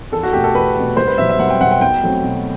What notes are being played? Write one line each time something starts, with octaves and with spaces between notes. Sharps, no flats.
E2 A4
F#4
B2 A3 G4
A4
E2 B4
B2 A3
C2 C5
B4
B2 F#3 E5
E5
C2 F#5
G5
B2 F#3 F#5
G5
B2 G5
F#3 A3 C4
B2